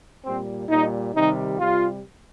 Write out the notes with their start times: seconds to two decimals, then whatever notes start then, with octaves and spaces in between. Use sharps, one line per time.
0.24 A#2 G3 C4
0.69 A#2 G3 D#4
1.14 C3 D#3 G3 D#4
1.59 C3 G3 F4